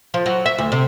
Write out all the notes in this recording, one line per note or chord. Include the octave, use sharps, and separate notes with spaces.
F3
F#3
E5
D2
C3